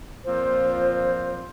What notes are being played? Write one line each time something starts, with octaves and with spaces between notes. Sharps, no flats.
A#2 F3 C4 F4 C5